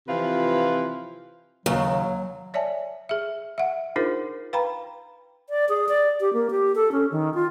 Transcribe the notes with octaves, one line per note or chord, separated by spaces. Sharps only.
C3 E3 F3 F4 B4 F5
D#2 C#3 F#3
C#5 D5 E5 G#5 A5
G#4 E5
E5 F#5
D4 D#4 F4 G#4 A#4 C5
B4 F5 G5 A#5 B5
D5
G#4
D5
G4
A#3
G4
A4
C#4
D#3
F4